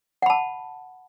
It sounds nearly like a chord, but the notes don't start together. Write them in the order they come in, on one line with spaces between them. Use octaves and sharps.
F#5 B5 A5